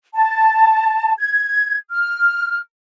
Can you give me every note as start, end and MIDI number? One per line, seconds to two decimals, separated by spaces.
0.15 1.13 81
1.18 1.77 92
1.91 2.58 89